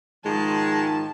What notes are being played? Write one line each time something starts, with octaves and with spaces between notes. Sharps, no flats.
G#2 D#3 F3 G#3 A5